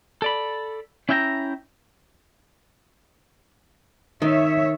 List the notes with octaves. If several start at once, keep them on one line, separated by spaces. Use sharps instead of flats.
A4 D5 B5
C#4 E4 E5 G5 G#5 A#5
D#3 C#5 E5